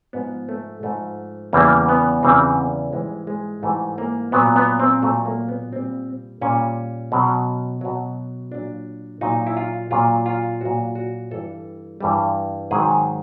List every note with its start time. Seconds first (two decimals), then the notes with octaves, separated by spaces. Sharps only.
0.13 G#2 F3 B3
0.49 A3
0.83 G#2 F3 A3
1.53 E2 C#3 E3 G3 A#3
1.89 B3
2.23 E2 C#3 E3 G3 C4
2.93 G#2 E3 G3 G#3
3.27 G#3
3.63 G#2 E3 G3 A3
3.98 A#3
4.32 A#2 F#3 B3
4.56 B3
4.80 C4
5.02 A#2 F#3 A3
5.25 A#3
5.49 B3
5.73 A#2 G3 C4
6.41 A#2 G3 C#4
7.12 B2 F#3
7.81 B2 F#3
8.51 A#2 F#3 D4
9.21 A#2 F#3 D#4
9.47 E4
9.57 F4
9.91 A#2 F#3 F4
10.26 F4
10.61 A#2 F#3 F#4
10.95 F#4
11.31 G2 E3 G3 A4
12.00 G2 E3 G3
12.71 G#2 D#3 F#3 G#4